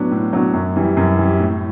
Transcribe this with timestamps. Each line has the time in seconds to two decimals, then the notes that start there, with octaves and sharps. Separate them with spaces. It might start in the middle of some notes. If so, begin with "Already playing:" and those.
Already playing: A2 F#3 B3 D4
0.11 A2
0.33 F#3 B3 D4
0.54 F#2
0.76 E3 G3
0.97 F#2
1.18 E3 G3
1.40 A2